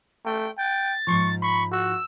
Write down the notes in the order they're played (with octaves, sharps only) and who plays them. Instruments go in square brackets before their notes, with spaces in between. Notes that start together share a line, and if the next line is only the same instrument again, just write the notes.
[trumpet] A3 [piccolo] G5
[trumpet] G5 [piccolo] A6
[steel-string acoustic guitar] G#2 F3 [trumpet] C#6
[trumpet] B5 [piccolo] C#6
[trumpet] F#4 [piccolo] E6